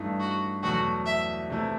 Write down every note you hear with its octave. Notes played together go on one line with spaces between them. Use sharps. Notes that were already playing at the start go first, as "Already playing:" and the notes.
Already playing: G2 E3 A3 D#4
F#4
E2 B2 F#3 A3 F#4
E5
C3 E3 A3 E4